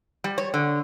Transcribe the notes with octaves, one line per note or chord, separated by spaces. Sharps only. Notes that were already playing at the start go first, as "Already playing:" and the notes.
G3
C#5
D3